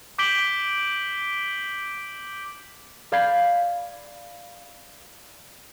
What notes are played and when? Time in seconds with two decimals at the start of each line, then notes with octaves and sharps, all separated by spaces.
0.19 D6 G6 B6 D7 F#7 G7
3.12 D5 F5 B5 G6 G#6 C7